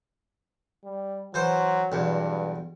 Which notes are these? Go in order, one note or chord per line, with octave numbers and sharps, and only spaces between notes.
G3
E3 F#3 C5
B1 E2 G2